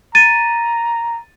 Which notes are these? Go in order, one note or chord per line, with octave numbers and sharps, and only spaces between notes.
A#5 A6 D#7